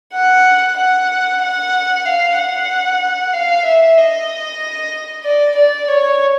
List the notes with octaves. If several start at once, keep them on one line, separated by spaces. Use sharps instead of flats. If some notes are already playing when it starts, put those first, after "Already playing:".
F#5
F#5
F#5
F5
F#5
F5
E5
D#5
D5
D5
C#5